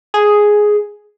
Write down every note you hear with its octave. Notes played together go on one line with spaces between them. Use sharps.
G#4